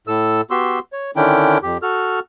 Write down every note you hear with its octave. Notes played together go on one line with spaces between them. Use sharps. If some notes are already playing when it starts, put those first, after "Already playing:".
A2 A4 E6
B3 F#4 G4 C6 E6
C#5
D3 D#3 C#4 D4 E4 G5
F2 G4
F#4 A4 F6